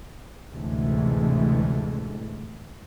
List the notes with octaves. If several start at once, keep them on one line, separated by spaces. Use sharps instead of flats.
A1 D2 C3 E3 G#3 A3